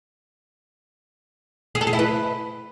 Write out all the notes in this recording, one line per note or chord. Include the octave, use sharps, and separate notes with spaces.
G#4
A4
G#4
E4
B4